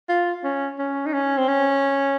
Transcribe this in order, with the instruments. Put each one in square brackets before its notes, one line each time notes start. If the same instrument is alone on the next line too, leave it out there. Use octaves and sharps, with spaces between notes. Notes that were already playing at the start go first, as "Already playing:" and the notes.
[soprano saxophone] F4
C#4
C#4
D#4
C#4
C4
C#4